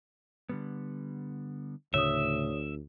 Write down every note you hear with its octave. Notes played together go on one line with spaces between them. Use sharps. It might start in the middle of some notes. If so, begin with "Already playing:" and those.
D3 G3 B3
D2 A2 C#3 C#5 E5 D#6